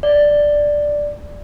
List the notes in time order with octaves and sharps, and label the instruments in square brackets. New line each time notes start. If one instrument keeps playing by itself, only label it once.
[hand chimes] D5